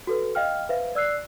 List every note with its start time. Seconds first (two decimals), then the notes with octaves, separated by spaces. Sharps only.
0.07 F#4 A4 B4
0.35 D#5 F5 G5 F6
0.69 B4 C5 E5 F5
0.95 D5 E6 F#6 C7